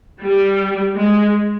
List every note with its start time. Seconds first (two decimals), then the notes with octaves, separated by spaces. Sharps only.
0.22 G3
0.96 G#3